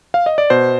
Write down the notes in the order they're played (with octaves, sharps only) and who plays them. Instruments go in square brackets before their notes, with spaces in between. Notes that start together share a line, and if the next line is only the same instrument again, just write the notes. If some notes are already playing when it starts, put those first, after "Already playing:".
[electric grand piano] F5
D#5
D5
B2 C5